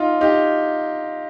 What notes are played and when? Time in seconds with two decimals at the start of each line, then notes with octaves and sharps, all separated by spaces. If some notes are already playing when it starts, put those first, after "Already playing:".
Already playing: D#4 F4
0.21 D#4 G4